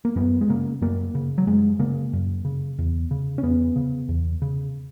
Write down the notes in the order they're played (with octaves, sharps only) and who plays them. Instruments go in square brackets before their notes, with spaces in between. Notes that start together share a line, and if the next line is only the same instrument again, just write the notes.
[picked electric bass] A#3
F#2 B3
G#3
C#3 A#3
F#2 A#3
C#3
F#3
F#2 G#3
C#3 A#3
F#2
C#3
E2
C#3
C#4
E2 B3
C#3
E2
C#3